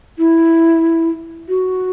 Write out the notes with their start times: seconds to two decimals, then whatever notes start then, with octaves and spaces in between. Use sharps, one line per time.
0.18 E4
1.49 F#4